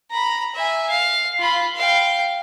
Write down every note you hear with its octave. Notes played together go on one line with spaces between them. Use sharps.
A#5 B5
E5 G#5
F5
F4 B5
F5 G5